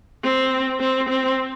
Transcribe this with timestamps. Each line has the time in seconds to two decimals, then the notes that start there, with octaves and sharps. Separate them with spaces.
0.23 C4
0.80 C4
1.09 C4